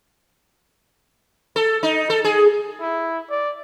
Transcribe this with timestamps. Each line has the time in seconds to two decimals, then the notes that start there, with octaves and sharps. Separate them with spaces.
1.56 A4
1.83 D#4
2.10 A4
2.24 G#4
2.80 E4
3.30 D5